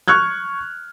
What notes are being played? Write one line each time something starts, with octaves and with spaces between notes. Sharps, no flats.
C#6 F6 F#6 G#6